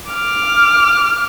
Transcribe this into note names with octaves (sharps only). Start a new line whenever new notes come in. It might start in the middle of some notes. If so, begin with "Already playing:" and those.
D6 F6